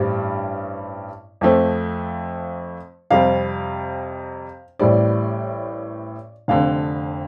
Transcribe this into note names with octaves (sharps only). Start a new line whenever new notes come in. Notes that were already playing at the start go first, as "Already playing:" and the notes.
Already playing: A1 G2 G3 C4
F2 F3 A3 C4
F2 C3 G3 C4 F5
A1 A2 G3 C4 D5
F1 F2 D3 F5